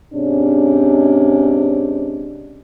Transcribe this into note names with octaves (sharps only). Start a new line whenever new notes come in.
G#2 C3 C#4 D4